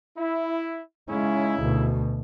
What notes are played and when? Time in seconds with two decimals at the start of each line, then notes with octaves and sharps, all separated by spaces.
0.17 E4
1.09 C#3 G#3 C#4 D#4 E4
1.61 D2 B2